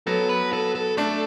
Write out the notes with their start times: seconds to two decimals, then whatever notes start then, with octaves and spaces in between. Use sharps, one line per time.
0.07 F#3 B3 A4
0.29 B4
0.53 A4
0.75 A4
0.97 A3 D4 A4